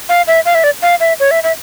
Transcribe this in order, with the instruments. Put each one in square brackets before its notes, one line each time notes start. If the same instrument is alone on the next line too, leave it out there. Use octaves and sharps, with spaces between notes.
[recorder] F5
E5
F5
E5
D5
F5
E5
C#5
E5
E5